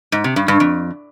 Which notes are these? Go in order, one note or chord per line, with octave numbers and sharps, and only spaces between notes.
G#2
C3
G2
G2
F2